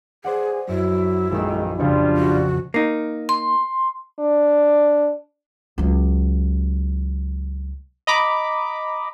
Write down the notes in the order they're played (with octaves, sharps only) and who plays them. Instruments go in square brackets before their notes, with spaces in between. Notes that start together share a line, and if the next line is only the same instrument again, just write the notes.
[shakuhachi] G#4 [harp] C5 D5 F#5
[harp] F#2 [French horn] F#3 [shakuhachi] E4
[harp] A#1 E6 [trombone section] F2 D#3 [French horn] G#3
[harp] F2 C#3 [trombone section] G3 F4 [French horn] D4
[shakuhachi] F#4
[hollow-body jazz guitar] A#3 D#4
[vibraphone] C6
[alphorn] D4
[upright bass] C#2 F#3
[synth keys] D#5 A#5 B5 D6